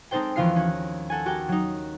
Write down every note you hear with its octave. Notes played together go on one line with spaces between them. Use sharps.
G#3 C4 D#4 A4 C5 G5
D#2 E3 F3 F4 F5 C7
C#4 F#4
A4 F#5 G#5
F#4 G4 A#4 G5
F#3 D#4